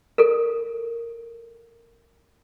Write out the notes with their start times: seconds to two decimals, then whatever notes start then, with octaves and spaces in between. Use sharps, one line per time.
0.18 A4 A#4